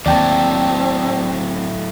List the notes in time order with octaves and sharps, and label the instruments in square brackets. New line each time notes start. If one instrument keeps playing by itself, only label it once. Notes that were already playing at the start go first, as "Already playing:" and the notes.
[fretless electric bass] D#2 [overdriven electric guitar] A2 F#3 [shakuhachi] C4 [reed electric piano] D5 G5 A5